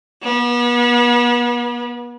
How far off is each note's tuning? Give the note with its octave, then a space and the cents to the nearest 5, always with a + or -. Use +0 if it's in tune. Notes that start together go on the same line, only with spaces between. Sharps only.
B3 -40